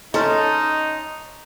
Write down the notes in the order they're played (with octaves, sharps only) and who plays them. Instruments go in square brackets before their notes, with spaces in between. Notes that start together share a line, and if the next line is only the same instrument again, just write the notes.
[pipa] A3 C#4 [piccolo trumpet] D#4 [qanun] A4 [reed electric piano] D#5 A#5 C6